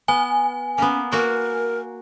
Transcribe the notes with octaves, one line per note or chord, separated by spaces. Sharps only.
B3 G#5
A#3 B3 C#4
A#3 F#4 A#4